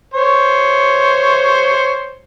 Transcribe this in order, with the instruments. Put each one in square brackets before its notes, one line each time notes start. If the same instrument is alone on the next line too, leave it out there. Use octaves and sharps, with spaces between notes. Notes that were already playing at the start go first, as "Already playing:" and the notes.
[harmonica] C5 C#5